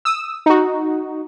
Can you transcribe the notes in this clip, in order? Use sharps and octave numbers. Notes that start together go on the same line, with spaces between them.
D#6 E6
D#4 F#4